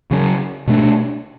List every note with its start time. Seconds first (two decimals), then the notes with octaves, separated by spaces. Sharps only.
0.11 C#3 F#3 C#4
0.67 B2 A3 D4